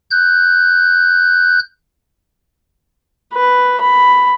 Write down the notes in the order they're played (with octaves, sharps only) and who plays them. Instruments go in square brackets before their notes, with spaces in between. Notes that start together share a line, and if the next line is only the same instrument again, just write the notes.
[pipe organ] F#6 G6
[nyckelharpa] B4
B5